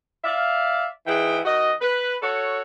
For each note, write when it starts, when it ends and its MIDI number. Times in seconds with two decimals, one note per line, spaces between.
0.25 0.85 74
0.25 0.85 76
0.25 0.85 77
1.07 1.39 44
1.07 1.39 52
1.07 1.39 68
1.07 1.39 78
1.07 1.39 79
1.45 1.72 51
1.45 1.72 66
1.45 1.72 75
1.81 2.16 71
2.22 2.61 66
2.22 2.61 69
2.22 2.61 73